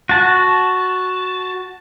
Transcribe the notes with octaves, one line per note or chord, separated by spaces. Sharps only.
F#4 A5